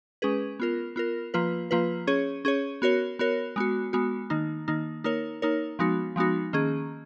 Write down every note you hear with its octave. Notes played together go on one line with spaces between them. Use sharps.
G#3 C#4 G#4 B4
B3 F4 A#4
B3 F4 A#4
F3 A#3 F4 B4
F3 A#3 F4 B4
C#4 G#4 C#5
C#4 G#4 C#5
B3 F#4 A#4 C#5
B3 F#4 A#4 C#5
G#3 B3 F#4
G#3 B3 F#4
D#3 A#3 D#4
D#3 A#3 D#4
A#3 D#4 A#4 C#5
A#3 D#4 A#4 C#5
F3 G#3 B3 D#4 F#4
F3 G#3 B3 D#4 F#4
D#3 A#3 C#4 G#4